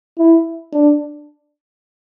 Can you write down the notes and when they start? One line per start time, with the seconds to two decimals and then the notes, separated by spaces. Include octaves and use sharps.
0.19 E4
0.73 D4